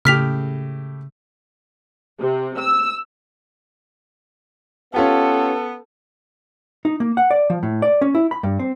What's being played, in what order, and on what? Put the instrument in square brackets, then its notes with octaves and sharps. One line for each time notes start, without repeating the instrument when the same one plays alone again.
[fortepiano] A2 G4 [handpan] C#3 [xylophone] F6 B6 F7
[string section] C3
E6
[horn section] B3 [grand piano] C#4 F4 G4 [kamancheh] A4
[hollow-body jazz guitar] D#4
A#3
F#5
D5
F3
A2
D5
C#4
E4
B5
G2
C4